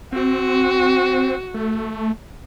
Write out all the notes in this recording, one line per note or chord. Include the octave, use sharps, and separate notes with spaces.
C4 F#4
A3